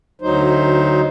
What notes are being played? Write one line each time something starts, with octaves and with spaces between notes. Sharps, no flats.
D2 F#3 D#4 C5